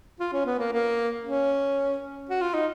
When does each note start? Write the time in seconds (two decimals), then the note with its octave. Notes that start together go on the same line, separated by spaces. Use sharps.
0.20 F4
0.33 C#4
0.46 B3
0.59 A#3
0.72 A#3
1.25 C#4
2.30 F#4
2.41 F4
2.54 D#4